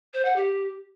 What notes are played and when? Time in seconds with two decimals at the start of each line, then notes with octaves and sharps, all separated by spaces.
0.13 C5
0.24 F#5
0.35 G4